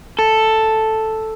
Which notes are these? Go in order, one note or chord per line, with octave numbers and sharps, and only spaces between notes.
A4